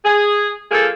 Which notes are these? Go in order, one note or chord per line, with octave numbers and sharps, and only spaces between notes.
G#4
F3 A#3 G#4 A4